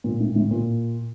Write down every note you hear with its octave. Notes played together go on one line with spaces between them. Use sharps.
A#2
A2
A2
A#2